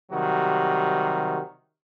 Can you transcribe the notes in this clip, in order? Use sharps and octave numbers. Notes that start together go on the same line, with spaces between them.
C3 D#3 F#3 G3 F#4